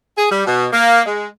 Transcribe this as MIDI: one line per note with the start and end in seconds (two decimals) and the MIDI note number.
0.18 0.28 68
0.31 0.47 55
0.47 0.65 47
0.73 1.01 58
1.06 1.27 56